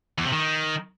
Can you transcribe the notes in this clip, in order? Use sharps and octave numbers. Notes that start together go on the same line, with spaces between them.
E2
C3
D#3